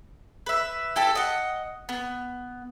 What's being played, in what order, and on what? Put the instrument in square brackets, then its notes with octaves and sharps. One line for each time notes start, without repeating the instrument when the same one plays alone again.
[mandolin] B4 E5
E4 G4 A4
D#5 F#5
B3